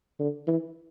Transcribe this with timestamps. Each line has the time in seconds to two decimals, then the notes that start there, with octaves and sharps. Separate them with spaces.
0.19 D3
0.47 E3